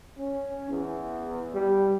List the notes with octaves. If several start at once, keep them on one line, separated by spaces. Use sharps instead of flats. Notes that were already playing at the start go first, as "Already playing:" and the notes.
C#4
E2
G3